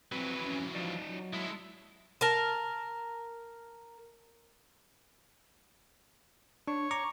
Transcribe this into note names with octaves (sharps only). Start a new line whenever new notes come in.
F2 E3 F#3 C4 B4
C#4
F3 D#4 D5
F#3
G#3 E4 A4
A#4 A5
D4 C#5
A#5 C#6 D6